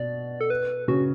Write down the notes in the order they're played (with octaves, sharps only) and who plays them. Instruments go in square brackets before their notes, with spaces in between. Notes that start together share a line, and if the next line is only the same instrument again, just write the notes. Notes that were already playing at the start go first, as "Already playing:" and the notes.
Already playing: [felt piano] B2 [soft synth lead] D5
[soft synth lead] A4
B4
[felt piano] C#3 [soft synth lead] F#4